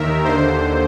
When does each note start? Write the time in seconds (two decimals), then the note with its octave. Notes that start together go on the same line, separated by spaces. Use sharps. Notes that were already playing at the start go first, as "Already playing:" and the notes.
Already playing: D#2 D#3 A#4 E5
0.24 D#2 D3 C5